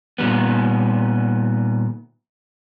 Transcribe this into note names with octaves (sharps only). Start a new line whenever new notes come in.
A#2 D#3 G3 B3